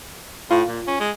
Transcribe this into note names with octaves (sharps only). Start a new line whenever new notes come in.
A2 F4
A#2
C#4
G#3